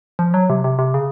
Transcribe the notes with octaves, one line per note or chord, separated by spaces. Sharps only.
F3
F#3
C3
C3
C3
C#3